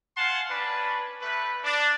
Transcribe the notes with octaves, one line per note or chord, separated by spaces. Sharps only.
F5 F#5 G#5 A5 C6
C#4 D4 B4
G3 A3 B4
D4